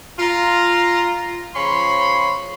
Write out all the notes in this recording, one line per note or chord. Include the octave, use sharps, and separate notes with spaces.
F4 A#5
C#3 F3 C#5 B5 C6